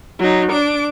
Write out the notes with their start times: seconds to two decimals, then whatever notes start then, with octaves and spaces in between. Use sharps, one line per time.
0.19 F#3 D#4
0.51 D4 D6